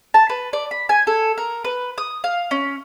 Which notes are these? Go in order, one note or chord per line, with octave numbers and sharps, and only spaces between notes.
A5
B4
D5
B5
G#5
A4
A#4
B4
D#6
F5
C#4